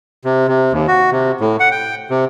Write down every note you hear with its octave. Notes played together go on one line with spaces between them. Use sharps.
C3
C3
D#2
F#4
C3
A2
F#5
G5
C3